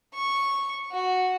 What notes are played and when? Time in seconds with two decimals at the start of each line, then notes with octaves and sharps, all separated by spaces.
0.14 C#6
0.92 F#4